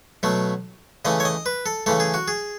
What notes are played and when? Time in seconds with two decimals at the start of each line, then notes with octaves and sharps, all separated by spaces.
0.23 B2 F#3 A3
1.05 C#3 E3 A3 D#5
1.20 C#5
1.25 D#5
1.46 B4
1.66 A4
1.86 C#3 E3 A3 A4
2.00 G#4
2.14 F#4
2.28 G#4